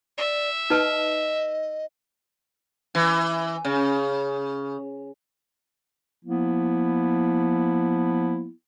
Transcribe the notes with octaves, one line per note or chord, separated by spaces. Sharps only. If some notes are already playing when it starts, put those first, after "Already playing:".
D5 E5
D#4 B4 D#5 A5
E3
C#3
F3 A#3 B3 E4